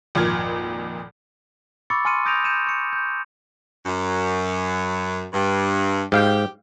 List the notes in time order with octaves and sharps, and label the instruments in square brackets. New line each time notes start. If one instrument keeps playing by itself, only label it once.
[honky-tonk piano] G#1 F2 A#2 F6 G#6
[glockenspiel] B5 C#6 D6 E6 A6 C#7
G#5 C6 F6 C#7 D#7
D#6 G6 A#6 D7 D#7 F7
G6 C#7 D#7 E7
C#6 C#7
G6
[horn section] F#2
G2
[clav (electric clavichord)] G#2 F5 G5 [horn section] G4